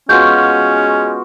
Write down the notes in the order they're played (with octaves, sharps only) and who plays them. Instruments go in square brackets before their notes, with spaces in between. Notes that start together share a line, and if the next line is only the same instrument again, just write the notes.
[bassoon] G#3 [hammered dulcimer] B3 F4 F#4 [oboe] C#4 [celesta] G6